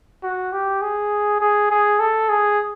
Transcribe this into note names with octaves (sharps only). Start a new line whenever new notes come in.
F#4
G4
G#4
G#4
G#4
A4
G#4